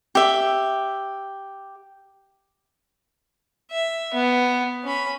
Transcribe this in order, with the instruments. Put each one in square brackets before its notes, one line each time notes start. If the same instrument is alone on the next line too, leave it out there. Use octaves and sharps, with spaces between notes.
[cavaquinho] G4 E5
[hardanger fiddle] E5
B3
C#4 B5